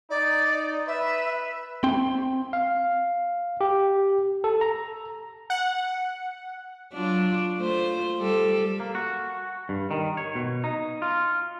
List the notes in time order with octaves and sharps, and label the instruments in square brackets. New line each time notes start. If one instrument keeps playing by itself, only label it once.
[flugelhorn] D#4 [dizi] D5
[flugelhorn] B4 [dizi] E5
[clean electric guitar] C4 G5
[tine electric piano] F5
G4
A4
A#5
[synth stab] F#5
[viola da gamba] F#3 D4 F4
A3 F4 C5
G3 A4
[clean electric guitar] A#3
F#4
G2
D#3
C#5
B2
D#4
F4